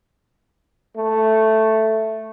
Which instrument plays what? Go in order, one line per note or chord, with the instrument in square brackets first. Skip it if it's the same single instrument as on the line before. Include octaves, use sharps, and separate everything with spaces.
[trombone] A3